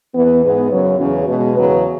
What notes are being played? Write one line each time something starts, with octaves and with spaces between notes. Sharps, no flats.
E2 E3 B3
G#2 G#3 B3
F#2 C#3 F#3
E2 C#3 F#3 C#4
B2 G#3 B3
E2 C#3 F#3 B3 B4